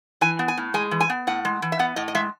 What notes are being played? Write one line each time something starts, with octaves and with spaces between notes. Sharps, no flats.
E3 G#5
B3
G#5
A2
G#3 G#5
E3
G#5
B3
A2 F#5
G#3
E3
E5
B3 F#5
A2 D#5
D#5
G#3 E5